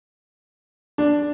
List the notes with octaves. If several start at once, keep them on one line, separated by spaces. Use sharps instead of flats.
D4